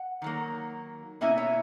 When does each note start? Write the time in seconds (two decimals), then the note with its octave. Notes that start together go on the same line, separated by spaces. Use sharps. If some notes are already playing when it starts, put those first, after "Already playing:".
Already playing: F#5
0.22 D#3 F#3 A#3
1.21 B2 A#3 C#4 E4 E5 G#5
1.37 C#5 E5